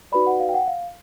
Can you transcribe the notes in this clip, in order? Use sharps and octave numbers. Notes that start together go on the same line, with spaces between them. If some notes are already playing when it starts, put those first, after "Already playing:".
D#4 F#4 B4 D5 B5
F#5
F5
G5
F#5
F5